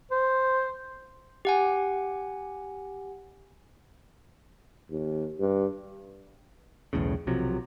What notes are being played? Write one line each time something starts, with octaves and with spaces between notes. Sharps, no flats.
C5
G4 F#5 G#5
D#2
G2
B1 E2 A2 C#3
B1 C3 F3 F#3